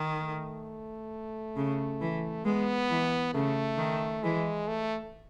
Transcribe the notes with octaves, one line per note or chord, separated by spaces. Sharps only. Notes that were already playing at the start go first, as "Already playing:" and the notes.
Already playing: D#3
A3
C#3
E3
G#3 B3
E3
C#3 A3
D#3
E3 G#3
A3